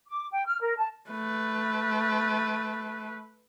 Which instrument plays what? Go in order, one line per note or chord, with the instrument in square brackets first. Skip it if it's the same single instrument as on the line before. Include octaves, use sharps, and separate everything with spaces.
[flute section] D6
G5
F6
A#4
A5
[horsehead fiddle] A3 B4